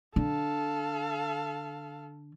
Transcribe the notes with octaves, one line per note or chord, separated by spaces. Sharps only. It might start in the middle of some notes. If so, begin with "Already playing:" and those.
D3 A4 F5